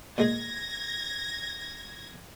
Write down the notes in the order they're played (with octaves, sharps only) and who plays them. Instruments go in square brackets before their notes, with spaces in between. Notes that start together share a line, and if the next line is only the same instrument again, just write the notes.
[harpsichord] A#2 G#3 G#4 [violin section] G#6 A#6